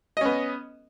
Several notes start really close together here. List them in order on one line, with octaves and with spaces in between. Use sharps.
D#5 C#4 B3